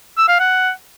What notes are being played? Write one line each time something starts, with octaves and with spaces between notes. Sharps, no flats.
E6
F5
F#5